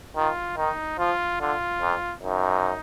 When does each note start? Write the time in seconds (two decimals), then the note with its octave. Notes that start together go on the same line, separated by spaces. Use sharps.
0.16 D#3 F4
0.57 D#3 D#4
0.99 F3 F4
1.41 D3 F4
1.81 F2
2.23 F#2 D#4